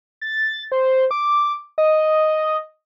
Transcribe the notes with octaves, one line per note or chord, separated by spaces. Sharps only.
A6
C5
D6
D#5